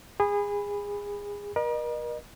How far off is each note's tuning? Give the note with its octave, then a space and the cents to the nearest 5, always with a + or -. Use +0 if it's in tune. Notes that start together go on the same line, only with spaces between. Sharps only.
G#4 -25 B5 +0
A#4 +40 D#5 -40